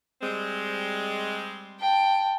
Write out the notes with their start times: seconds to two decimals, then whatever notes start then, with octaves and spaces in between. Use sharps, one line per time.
0.22 G3 G#3 C4
1.80 G5 A5